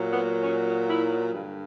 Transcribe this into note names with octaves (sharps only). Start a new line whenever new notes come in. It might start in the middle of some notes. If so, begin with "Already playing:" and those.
Already playing: A#2 F#3
B3
C#4
E4
G2 D3